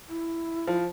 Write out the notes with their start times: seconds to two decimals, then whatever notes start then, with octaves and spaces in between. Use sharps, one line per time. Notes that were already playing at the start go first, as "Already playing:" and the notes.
0.09 E4
0.67 F3